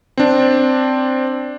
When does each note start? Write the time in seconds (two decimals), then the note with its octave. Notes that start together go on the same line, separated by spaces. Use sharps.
0.17 C4 D4